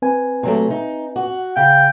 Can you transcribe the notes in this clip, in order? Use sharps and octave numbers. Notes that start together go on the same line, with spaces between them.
C4 B4 G#5
C3 F#3 A3
D#4
F#4
C#3 F5 G5